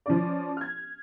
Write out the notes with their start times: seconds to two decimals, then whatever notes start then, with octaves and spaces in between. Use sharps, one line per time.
0.06 F3 C#4 D5
0.57 F6 G#6